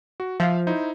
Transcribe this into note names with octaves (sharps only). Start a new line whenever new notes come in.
F#4
F3 E5 F5
D#4 E4 C5